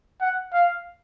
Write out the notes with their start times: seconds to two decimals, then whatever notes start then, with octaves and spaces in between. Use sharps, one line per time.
0.21 F#5
0.53 F5